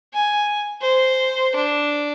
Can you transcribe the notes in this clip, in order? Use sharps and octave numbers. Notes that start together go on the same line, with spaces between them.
G#5
C5
D4